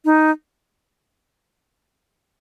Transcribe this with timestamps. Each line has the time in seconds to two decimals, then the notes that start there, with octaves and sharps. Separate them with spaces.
0.05 D#4